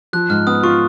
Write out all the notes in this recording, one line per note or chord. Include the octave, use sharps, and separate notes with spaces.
F3 F#6
G#2 F6
B3 D#6
F4 C#6